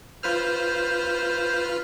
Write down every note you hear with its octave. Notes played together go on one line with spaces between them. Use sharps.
F4 B4 C5 F6